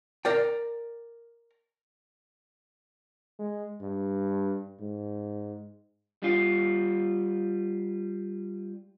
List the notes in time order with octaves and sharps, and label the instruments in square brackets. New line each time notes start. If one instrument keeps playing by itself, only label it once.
[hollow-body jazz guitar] A#4 D5 G5
[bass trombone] G#3
G2
G#2
[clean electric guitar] G3 F4